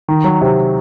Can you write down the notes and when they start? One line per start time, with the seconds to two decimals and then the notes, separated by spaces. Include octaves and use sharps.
0.08 D#3
0.24 F#3
0.41 C3